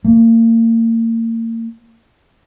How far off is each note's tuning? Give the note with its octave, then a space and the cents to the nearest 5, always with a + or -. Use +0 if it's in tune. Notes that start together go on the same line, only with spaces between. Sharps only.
A#3 -35